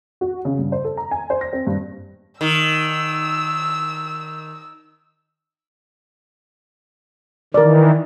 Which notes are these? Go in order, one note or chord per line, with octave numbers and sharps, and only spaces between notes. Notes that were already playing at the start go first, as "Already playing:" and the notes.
F#4
C#3
G2
C5
A4
A#5
G#5
C5
A#6
C4
G2
D#3 E6
D#3 E3 A#4 D5